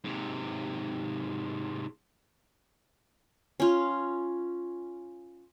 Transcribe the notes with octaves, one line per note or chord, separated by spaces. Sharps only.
G#2 C3
C#4 F4